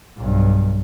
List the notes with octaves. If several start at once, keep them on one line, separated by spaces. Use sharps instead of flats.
B1 G2